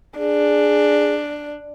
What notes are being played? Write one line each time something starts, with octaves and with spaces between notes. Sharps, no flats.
D4 G#4